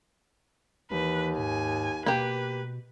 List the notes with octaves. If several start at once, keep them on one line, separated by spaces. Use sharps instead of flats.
D#2 E3 B4
G#2 G#5
B2 A#3 G4 B4